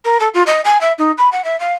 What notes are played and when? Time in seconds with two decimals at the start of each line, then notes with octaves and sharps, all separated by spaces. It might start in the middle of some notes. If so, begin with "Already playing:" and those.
0.05 A#4
0.20 A4
0.34 F4
0.47 D#5
0.65 G#5
0.81 E5
0.98 D#4
1.18 B5
1.32 F#5
1.44 E5
1.60 F5